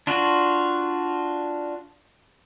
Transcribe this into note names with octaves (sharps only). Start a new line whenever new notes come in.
D4 F4 F#4